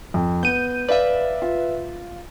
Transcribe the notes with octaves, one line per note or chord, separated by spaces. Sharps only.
F2
B3 G6 D#7
B4 D5 E5 F5
F4